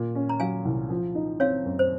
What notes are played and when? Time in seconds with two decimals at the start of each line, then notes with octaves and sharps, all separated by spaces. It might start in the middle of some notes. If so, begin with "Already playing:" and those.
Already playing: A#2
0.15 C#4
0.29 A#5
0.40 F#3 F5 G#5
0.65 C2
0.90 F3
1.15 D#4
1.40 C4 C#5 F5
1.65 F#2
1.79 C5